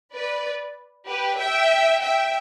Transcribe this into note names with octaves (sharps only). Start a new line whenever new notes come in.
B4 D5
G4 B4
E5 G5
E5 G5